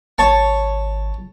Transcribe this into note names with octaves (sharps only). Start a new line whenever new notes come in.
G#1 C#5 A5 C#6